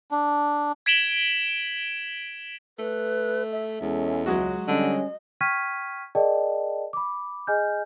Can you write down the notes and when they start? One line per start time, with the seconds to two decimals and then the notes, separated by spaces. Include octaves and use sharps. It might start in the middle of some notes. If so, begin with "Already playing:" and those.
0.11 D4
0.86 G#6 B6 D7 E7 F#7 G7
2.79 A3 B4
3.52 E5
3.81 E2 G#3 C#4 A4
4.26 C#2 F#3 G#3 F#4
4.68 D3 G3 C#4 D#5
5.41 G5 C#6 F6 G#6 B6 D#7
6.15 G#4 A#4 D5 D#5 G5 A5
6.93 B5 D6
7.47 G#4 D#5 G#5 F6 G6